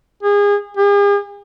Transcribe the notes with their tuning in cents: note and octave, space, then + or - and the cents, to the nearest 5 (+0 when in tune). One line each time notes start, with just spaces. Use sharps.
G#4 -30
G#4 -45